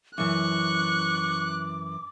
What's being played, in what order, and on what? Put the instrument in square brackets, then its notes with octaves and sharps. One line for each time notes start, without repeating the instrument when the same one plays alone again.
[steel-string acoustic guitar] F#2 E3 [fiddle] C#6 [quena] D6 [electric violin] F#6